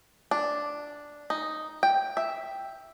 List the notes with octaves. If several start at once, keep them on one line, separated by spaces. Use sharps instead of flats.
D4
D#4
G5
E5